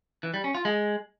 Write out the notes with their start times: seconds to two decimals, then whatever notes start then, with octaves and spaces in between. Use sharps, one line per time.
0.23 E3
0.34 G3
0.44 C#4
0.55 F4
0.65 G#3